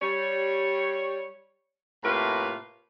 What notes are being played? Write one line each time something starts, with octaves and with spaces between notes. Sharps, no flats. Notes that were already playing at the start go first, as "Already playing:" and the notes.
G3 C#5
A2 C3 A3 A#3 F4 B4